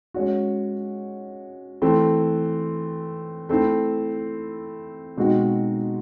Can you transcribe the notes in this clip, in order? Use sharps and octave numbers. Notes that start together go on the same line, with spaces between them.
G#3 C#4 F#4
E3 A3 C4
A3 C4 E4
B2 G#3 C4 D#4 F#4